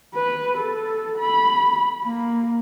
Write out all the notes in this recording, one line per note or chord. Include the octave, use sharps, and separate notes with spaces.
B4
A4
B5
A#3